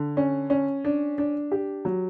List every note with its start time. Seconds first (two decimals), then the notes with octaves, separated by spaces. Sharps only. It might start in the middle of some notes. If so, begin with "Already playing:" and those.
Already playing: D3
0.17 C#4
0.50 C#4
0.85 D4
1.18 D4
1.52 G4
1.85 F#3